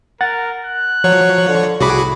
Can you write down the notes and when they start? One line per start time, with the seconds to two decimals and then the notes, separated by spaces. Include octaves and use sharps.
0.21 A#4 F#5 A6
0.65 F#6
1.04 F3 F#3 C#5
1.48 D3
1.80 C2 A2 F#4 G#4 B5 D6